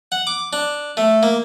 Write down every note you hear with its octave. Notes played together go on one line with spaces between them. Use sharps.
F#5
D6
D4
A3
A#3